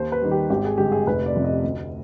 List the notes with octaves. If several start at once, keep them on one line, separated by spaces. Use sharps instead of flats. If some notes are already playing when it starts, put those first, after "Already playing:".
Already playing: D#2 C5
B4
D#3 G3
G4
G#1 G4
G#4
G2 D3 G#3 G4
G#4
F1 B4
D5
F2 C3
D#5
D2